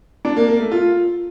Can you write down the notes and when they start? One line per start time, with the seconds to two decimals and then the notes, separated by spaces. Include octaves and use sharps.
0.25 D4
0.36 A#3
0.48 A#3
0.60 A3
0.71 F4